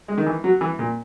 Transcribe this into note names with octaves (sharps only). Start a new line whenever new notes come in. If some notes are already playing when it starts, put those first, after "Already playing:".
G#3
D#3
E3
F#3
E3
A#2